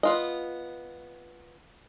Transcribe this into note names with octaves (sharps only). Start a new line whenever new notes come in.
B3 F4 D#5